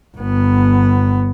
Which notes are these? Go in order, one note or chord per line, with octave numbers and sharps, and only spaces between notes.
G1 B3